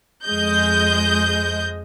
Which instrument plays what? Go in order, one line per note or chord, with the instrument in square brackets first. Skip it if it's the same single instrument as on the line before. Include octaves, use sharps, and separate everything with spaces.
[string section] F2 G#3 D#5 G6